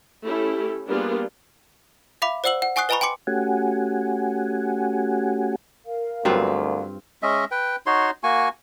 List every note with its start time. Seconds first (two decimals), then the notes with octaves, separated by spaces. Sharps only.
0.25 A3 C#4 E4 G4 A4
0.87 G3 A#3 B3 D4 F4 G#4
2.22 E5 F5 B5 D6
2.44 C5 D5 F#5 E6 F#7
2.62 F#5
2.76 F#5 G#5 C#6 D#6 F#6 C7
2.89 B4 D#5 G#5 A#5 B5 C#6
3.01 G5 G#5 C6 D6 C#7
3.27 A3 C#4 F#4 G4 F#5 G#5
5.86 A#4 F5
6.25 D2 G2 F#3 B3 C4 F4
7.23 G#3 C#4 D#5 E5
7.51 B4 G5
7.86 D#4 F#4 C#5 C6
8.23 A#3 F#4 G#5 C#6